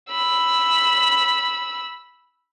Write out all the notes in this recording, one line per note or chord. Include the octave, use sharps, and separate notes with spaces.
B5 E6